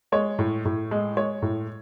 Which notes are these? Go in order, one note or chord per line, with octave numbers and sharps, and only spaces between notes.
G#3 C#5
A2
A2
G#3
G#3 C#5
A2